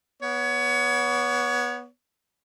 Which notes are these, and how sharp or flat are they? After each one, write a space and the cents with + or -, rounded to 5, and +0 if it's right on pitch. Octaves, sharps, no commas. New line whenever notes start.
B3 -15 C#5 +25